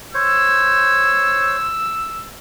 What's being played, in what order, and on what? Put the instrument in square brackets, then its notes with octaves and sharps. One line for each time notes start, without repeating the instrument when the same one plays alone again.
[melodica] C5 C#5 [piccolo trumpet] E6